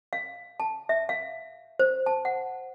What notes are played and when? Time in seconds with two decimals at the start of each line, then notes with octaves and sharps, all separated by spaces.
0.13 F5
0.60 A5
0.89 E5
1.09 F5
1.79 C5
2.06 A5
2.25 F#5